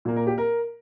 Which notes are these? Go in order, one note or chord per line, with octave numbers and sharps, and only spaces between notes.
A#2 A#3
A#4
G4
A#4